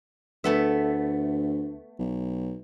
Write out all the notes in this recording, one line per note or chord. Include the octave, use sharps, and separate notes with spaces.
D2 A3 B3 E5
B1